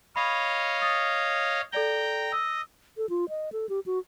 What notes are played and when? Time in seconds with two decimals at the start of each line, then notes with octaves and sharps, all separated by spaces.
0.16 C#5 D#5 F5 B5
0.82 D#6 A6
1.72 A4 D5 G5 A#5 G7
2.32 D#5 E6
2.97 A4
3.09 F4
3.29 D#5
3.53 A4
3.69 G4
3.86 F#4